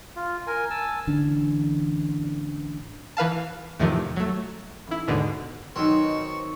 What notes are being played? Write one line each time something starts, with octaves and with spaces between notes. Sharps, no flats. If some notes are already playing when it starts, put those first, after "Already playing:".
F4
A#4 G#5
G#5 A5 E6
A1 D3 E3 D4
E3 B4 F5 A5
E2 A2 C3 D#3 F3
F#3 A3
A1 E4
D#2 G#2 B2 D3
B2 D#3 F#3 C4 D#4 A#4 C#6